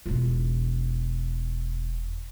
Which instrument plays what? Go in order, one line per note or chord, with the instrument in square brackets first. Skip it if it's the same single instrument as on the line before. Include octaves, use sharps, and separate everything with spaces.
[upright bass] E1 F4